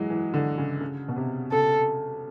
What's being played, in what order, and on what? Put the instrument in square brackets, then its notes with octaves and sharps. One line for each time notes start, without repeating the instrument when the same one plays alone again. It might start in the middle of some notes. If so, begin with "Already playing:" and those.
Already playing: [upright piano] E3 F#3 G#3
E3
D3
C#3
C#3
B2
C3
[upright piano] C#3 [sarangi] A4